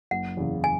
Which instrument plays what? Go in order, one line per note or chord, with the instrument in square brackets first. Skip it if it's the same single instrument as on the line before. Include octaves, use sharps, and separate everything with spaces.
[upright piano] F#1 [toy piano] F#5
[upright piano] E2 C#3
[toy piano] G#5